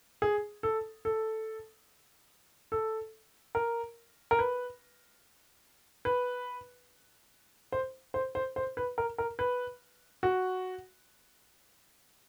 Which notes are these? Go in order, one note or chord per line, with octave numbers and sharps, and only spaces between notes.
G#4
A4
A4
A4
A#4
A#4
B4
B4
C5
C5
C5
C5
B4
A#4
A#4
B4
F#4